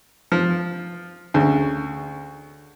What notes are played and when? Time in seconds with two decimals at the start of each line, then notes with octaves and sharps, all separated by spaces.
0.32 F3
1.34 D2 C#3